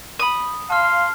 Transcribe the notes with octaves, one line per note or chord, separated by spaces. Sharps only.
B5 D#6
F5 A5 C6 F6